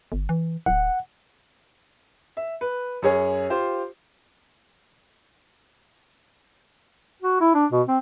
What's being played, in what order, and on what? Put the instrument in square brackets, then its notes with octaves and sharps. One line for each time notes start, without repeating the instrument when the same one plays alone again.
[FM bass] G1
E3
[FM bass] D1 [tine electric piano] F#5
[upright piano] E5
B4
F#2 C#4 G#4 C#5
F4 G4 C5
[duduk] F#4
E4
D4
B2
C4